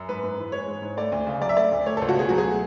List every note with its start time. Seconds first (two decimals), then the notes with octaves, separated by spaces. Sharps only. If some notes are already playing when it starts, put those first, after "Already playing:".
Already playing: F#2
0.09 G#2 B4
0.23 G#2
0.37 E3
0.52 G#3 C#5
0.67 G#2
0.82 G#2
0.97 A3 D5
1.12 D2
1.26 C#3
1.41 F#3 D5
1.49 E5
1.57 A3 D5
1.72 D2
1.86 A3 C#5
1.97 C#2 A4
2.09 F#4
2.16 B2 G#4
2.29 F#3 F#4
2.38 G#4
2.45 A3